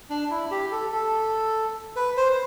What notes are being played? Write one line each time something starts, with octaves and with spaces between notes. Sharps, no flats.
D4
E4
G4
A4
A4
B4
C5